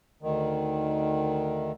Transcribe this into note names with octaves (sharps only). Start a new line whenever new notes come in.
D2 D#3